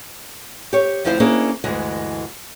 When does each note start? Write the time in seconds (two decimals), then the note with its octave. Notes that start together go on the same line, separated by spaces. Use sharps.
0.73 G4 C#5
1.05 D2 F3 C4 E4 C5 F5
1.20 A#3 C#4 D4 E4 G#4
1.64 D2 G2 E3 G#3